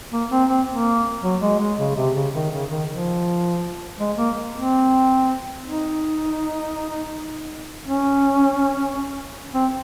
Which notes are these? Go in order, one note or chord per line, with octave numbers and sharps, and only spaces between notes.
A#3
C4
C4
A#3
F#3
G#3
G#3
C#3
C3
C#3
D#3
C#3
D#3
F3
G#3
A#3
C4
D#4
C#4
C4